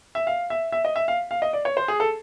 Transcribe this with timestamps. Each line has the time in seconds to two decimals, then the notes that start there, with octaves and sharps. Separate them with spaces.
0.15 E5
0.27 F5
0.50 E5
0.72 E5
0.85 D#5
0.96 E5
1.08 F5
1.31 F5
1.42 D#5
1.53 D5
1.65 C#5
1.77 C5
1.88 G#4
2.00 A4